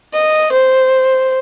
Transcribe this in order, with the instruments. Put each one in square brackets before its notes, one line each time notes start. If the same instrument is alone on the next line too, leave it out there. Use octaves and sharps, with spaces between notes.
[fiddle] D#5
C5